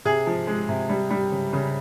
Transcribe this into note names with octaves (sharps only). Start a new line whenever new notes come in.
C3 G#4
F3
G#3
C3
G3
G3
C#3
C#3